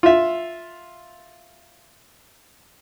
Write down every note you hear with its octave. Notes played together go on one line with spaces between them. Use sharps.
F4 E5